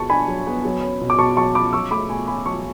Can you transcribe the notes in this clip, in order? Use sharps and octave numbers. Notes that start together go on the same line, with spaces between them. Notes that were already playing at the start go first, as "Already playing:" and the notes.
Already playing: B2 F#3 B3 A5 C#6
D4 G#5 B5
F#3
B3
F#3
C#4
B2
D6
B2 A5 C#6
F#3 A5 C#6
C#4 B5 D6
F#3 C#6 E6
A3 B5 D6
B2 G#5 B5
C#4 G#5 B5
F#3 A5 C#6